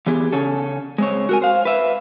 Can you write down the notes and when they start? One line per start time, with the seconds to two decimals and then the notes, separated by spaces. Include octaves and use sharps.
0.07 E3 B3 G4 G#4
0.32 C#3 C#4 A4
0.98 G#3 C4 C#5
1.29 F#4 A#4 G#5
1.42 C5 F5
1.65 B4 E5